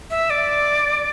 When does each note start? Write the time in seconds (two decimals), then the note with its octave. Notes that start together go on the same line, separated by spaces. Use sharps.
0.10 E5
0.30 D5